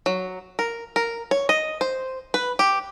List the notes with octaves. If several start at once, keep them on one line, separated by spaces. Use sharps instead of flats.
F#3
A#4
A#4
C#5
D#5
C5
B4
G4